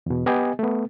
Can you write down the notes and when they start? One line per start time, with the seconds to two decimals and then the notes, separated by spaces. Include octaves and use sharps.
0.06 E2 B2
0.26 B3 G4 D#5 G#5
0.59 A3 B3